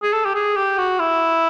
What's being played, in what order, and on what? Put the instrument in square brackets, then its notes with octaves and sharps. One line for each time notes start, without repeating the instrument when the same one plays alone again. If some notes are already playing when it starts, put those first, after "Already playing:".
[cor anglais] G#4
A4
G4
G#4
G4
F#4
E4